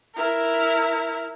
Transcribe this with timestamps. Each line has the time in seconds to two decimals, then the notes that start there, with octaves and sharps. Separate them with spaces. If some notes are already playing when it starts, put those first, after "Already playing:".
0.15 E4 A#4